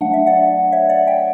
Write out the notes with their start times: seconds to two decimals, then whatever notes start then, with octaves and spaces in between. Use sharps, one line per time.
0.01 F#3 A3 D4 F#5
0.14 E5
0.26 D5 F#5
0.72 C#5 E5
0.89 D5 F#5
1.07 E5 G5